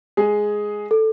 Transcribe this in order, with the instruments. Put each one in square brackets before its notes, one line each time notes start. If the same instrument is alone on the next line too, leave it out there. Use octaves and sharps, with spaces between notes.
[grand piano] G#3 G#4
[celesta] A4